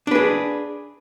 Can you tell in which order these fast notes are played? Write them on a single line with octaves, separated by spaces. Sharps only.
D4 B4 G#4